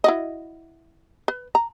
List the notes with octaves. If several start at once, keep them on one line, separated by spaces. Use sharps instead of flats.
E4 F#4 D#5
B4
A#5